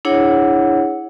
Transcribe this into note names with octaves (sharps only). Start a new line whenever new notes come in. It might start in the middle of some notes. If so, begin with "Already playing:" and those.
D4 E4 G#4 C#5 F#5